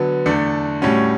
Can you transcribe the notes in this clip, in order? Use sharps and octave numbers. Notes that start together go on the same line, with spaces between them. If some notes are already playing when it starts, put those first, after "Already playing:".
Already playing: D3 F#3 B3
E2 D3 A3 D4
A2 G3 C#4 F#4